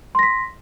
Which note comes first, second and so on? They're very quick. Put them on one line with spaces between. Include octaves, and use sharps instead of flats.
C6 A#6 B6